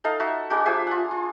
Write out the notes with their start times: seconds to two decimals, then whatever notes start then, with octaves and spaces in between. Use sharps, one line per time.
0.04 D#4 A4 D#5 F5
0.20 D#4 F#4 E5 A5
0.50 G#3 A#3 D4 F#4
0.65 F3 G4 G#4 E5
0.87 F4 F#5
1.11 F4